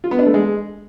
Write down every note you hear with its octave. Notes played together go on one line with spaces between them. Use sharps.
F4
B3
D4
A3
G#3